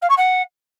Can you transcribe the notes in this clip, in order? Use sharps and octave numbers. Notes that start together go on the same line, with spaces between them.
F5
C#6
F#5